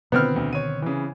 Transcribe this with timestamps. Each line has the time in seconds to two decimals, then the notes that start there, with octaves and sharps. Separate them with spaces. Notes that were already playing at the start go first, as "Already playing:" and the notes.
0.12 B2 D3 D#3 B3 C4 F6
0.36 D2
0.53 C#5 D#7
0.82 C#3 E3